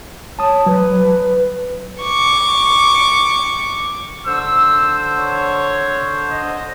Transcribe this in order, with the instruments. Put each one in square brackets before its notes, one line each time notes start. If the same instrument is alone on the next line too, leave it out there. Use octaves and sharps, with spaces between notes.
[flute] C#5 [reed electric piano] A5 D#6
[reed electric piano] F#3 [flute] B4
[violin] C#6 D6
[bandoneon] D3 C5 [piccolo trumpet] E6
[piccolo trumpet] C#5
D#5